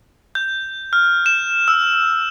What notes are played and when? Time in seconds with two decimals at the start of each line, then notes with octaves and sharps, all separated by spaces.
0.35 G6
0.93 F6
1.26 E7
1.68 E6